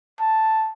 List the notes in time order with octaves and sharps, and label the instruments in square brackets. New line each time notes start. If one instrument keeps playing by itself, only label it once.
[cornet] A5